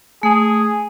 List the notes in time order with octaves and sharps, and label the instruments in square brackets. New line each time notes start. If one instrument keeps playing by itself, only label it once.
[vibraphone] A3 [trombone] G#4